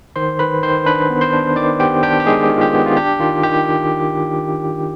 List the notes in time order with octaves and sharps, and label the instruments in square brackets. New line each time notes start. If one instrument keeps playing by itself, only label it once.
[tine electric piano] D#3 C5 C6
D#3 B4 B5
D#3 C5 C6
D4 B4 B5
B3
C5 C6
D4
D#3 D5 D6
B3 G4 G5
D4 G4 G5
G4
D#3 G#3 G#4
D#3
F4
G4
B3
F4
D4 G4
D#3 F4
D#3 G4